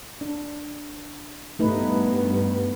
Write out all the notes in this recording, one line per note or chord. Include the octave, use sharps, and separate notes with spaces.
D4
G2 A3 B3 D#4 B4